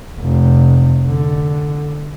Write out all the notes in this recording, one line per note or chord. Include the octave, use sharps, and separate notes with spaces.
F1
D3